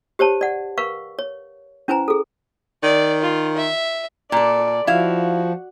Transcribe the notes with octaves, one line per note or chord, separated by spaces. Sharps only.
G4 C5 C#5 A5
D5 F#5
A#4 B4 F5 C#6
C#5
C#4 E4 B4 C5 G#5 A#5
G#4 A4
D#3 D5
F4
E5
A#2 A4 D5
F3 E4 F#4 F5